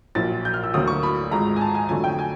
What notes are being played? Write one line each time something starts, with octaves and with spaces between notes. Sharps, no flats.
A#1 A#2 F#3 A6
G6
F6
E6
D2 D3 F#3 A#3 D#6
C#6
B5
G#1 G#2 F3 G#3 A#5
G#5
A5
G#5
F2 D3 F#3 A3 G#5
G5
G#5